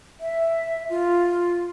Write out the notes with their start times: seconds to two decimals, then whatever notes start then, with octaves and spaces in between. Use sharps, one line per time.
0.20 E5
0.90 F4